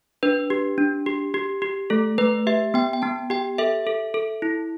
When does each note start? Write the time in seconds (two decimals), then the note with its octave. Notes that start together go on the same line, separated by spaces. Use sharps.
0.23 D4 B4
0.50 G4
0.78 D4
1.06 G4
1.34 G4
1.62 G4
1.90 A3 A4
2.18 A3 B4
2.47 G4 E5
2.74 B3 G5
2.93 G5
3.02 B3 A5
3.30 G4 G5
3.58 A4 E5
3.87 A4
4.14 A4
4.42 E4